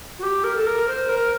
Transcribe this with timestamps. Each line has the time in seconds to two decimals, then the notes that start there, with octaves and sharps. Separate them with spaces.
0.19 F#4
0.23 G4
0.44 A#4
0.56 A4
0.67 A#4
0.88 C5
1.09 A#4